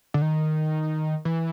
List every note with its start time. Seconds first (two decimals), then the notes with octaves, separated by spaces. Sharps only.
0.14 D3
0.22 D#3
1.25 E3